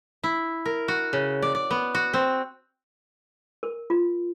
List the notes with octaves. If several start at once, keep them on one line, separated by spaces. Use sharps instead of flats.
E4
A#4
F#4
C#3
D5
D5
B3
F#4
C4
A#4
F4